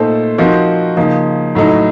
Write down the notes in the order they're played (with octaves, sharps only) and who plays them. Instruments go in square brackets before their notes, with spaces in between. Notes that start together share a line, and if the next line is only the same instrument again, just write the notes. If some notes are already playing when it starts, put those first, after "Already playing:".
Already playing: [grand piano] A#2 A3 D#4 A4 C5
F3 C4 D#4 F#4 A#4
C#3 F3 A#3 D#4
A2 F#3 A3 D#4